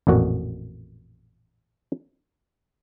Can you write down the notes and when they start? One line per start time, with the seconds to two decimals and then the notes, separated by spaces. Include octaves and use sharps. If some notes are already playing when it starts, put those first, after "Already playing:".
0.07 A1 F2 A#2 F#4